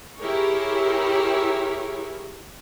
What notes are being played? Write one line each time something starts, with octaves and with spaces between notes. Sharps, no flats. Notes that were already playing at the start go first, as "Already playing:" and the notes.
E4 G4 G#4 A#4 C#5